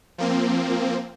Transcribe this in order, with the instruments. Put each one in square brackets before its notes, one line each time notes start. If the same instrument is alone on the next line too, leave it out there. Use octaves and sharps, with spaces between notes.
[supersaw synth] F3 A#3 C4